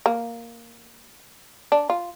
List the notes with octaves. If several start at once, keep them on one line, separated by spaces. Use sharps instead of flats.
A#3
D4
F4